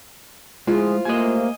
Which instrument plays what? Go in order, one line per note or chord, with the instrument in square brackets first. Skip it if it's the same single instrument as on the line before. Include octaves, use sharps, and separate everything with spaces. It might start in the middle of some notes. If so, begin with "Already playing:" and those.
[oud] D2 F3 E4 [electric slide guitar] G#3 [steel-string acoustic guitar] F4 [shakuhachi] G#4
[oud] G3 A3 C4 [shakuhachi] A#3 [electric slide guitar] D#5 G#5